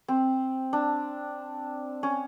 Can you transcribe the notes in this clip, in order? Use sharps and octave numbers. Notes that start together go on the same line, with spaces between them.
C4
D4
C#4